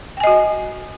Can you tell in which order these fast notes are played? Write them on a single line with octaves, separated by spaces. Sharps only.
G5 G#5 D#5 F#4